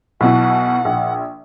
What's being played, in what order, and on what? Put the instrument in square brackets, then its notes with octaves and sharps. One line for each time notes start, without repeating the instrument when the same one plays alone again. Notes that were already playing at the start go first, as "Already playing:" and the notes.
[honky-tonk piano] B1 B2 E4 [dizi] F#5
[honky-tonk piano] A#1